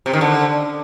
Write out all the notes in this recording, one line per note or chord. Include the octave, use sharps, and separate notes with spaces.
C3
D#3
D3